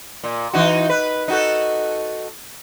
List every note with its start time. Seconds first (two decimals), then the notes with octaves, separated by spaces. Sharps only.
0.24 A#2
0.53 E3 D#4 F#4
0.89 B4
1.28 D#4 F#4 A4